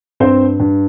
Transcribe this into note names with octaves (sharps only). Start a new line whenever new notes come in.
G2 C4 C5
G2